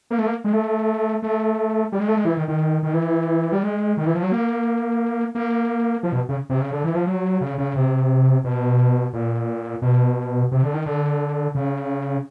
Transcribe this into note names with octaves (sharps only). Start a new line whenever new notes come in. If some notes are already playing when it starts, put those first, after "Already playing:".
A#3
A3
A#3
G#3
A3
A3
G3
G#3
A3
G#3
E3
D#3
D#3
D#3
E3
G3
G#3
D#3
E3
F3
F#3
A#3
A#3
F3
B2
C#3
C3
C#3
D3
E3
F3
F#3
C#3
C#3
C3
B2
A#2
B2
C3
D3
D#3
D3
C#3